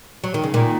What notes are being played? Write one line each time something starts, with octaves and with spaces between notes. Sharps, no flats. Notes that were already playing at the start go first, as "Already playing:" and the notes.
F#3
D#3
C#3
A#2 D#3